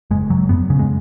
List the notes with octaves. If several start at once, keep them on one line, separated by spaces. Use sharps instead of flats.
F#1 G#3
F#1 F#3
F#2 B3
C#3
G#3